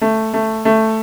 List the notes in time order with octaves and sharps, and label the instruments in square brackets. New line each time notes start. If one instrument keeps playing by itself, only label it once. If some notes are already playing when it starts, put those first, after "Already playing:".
[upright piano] A3
A3
A3